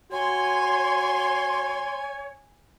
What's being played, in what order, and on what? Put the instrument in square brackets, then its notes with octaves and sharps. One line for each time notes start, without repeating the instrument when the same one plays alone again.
[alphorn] F#4 [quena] C#5 [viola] G#5 [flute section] C6